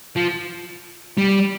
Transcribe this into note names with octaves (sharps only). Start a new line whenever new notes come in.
F3
G3